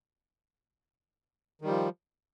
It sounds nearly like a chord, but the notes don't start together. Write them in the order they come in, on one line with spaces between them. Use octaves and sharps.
D#3 G3 F3